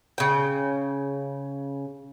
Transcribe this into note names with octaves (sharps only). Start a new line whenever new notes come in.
C#3 G5